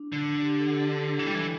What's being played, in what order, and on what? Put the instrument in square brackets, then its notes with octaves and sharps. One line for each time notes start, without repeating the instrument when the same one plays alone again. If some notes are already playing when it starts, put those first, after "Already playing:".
Already playing: [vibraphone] D4
[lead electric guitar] D3
[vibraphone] G4
A4
A4
A4
[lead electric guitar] E3 [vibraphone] A4
[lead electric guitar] G3
E3